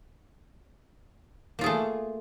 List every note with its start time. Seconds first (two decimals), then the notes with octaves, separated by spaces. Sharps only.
1.59 A#3
1.61 F4
1.64 G#4
1.66 A3